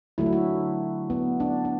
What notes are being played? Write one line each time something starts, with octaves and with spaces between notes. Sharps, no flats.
D3 F#3 A3 E4
F#4
E4
B3
D4
D4